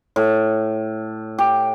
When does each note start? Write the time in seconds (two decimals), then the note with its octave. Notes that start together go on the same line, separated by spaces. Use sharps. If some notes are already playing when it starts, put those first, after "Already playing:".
0.16 A2
1.38 G4